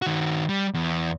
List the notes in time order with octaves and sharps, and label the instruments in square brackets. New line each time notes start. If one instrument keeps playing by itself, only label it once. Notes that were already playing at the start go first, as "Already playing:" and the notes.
[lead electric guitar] D#3 F#4
G3
E2